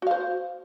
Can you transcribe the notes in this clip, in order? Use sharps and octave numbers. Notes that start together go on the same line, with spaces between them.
F#4 C5 F5